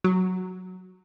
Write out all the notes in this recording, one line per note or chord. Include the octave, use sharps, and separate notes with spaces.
F#3